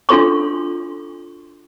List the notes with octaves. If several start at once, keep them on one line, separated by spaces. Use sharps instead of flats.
D4 F4 F#4 A4 C6 C#6